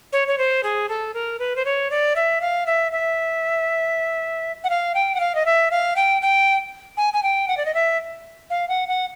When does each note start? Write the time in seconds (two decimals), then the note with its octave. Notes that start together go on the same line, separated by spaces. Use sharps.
0.13 C#5
0.28 C#5
0.38 C5
0.63 G#4
0.89 A4
1.14 A#4
1.39 B4
1.56 C5
1.65 C#5
1.91 D5
2.16 E5
2.41 F5
2.66 E5
2.92 E5
4.64 F#5
4.70 F5
4.95 G5
5.15 F#5
5.20 F5
5.35 D#5
5.46 E5
5.71 F5
5.96 G5
6.22 G5
6.97 G#5
7.13 G#5
7.23 G5
7.48 F#5
7.57 D5
7.66 D#5
7.75 E5
8.50 F5
8.69 F#5
8.88 F#5